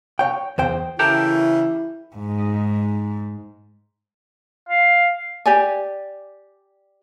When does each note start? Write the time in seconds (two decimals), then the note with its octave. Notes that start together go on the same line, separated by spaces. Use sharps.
0.19 C#5 G5
0.58 E2 C5 G5
0.99 C#3 E3 E4 G4 A4 A#4 G6
2.16 G#2
4.69 F5
5.46 G4 D5 G#5